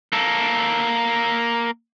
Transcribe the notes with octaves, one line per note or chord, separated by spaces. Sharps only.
A#3 A4